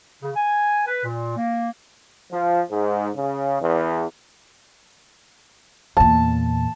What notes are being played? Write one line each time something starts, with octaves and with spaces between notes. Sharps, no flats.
C#3
G#5
B4
A#2
A#3
F3
G#2
C#3
E2
E2 A#2 A5